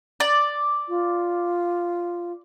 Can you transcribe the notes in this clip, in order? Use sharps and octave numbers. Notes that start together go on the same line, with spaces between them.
D5
F4